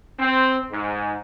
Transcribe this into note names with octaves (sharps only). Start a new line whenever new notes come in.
C4
G#2